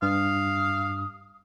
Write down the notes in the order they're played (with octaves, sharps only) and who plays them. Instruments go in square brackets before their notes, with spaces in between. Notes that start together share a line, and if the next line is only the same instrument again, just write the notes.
[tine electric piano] G2 [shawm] F5 [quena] D#6